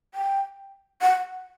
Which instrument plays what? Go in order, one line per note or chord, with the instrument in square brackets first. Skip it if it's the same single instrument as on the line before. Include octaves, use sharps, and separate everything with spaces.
[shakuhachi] G5
F#5